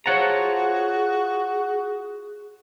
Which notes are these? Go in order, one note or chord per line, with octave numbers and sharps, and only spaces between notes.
F4 F#4 G#4 C5 C#5 F#5 A5 A#5